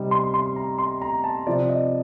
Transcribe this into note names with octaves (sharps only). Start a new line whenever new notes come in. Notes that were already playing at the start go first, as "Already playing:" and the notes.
Already playing: C3 G3 C4 D#4
C6
C6
A#5
C6
A#5
A5
C3 F3 C4 D5
D#5